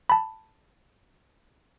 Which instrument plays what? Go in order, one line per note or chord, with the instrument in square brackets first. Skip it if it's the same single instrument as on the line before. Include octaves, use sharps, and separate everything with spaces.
[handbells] A5 B5